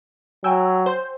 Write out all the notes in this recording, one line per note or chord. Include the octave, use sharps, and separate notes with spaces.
F#3 G5 G#5 E6
C5 C6 G6